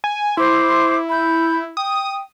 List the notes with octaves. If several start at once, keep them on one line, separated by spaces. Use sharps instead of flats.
G#5
E4 C5 C6 D6
B5 G6
G5 D#6